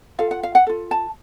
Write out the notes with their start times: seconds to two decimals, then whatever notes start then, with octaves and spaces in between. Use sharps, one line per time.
0.19 F4 A4 F5
0.31 F#5
0.43 F5
0.55 F#5
0.67 F4 A4
0.91 A5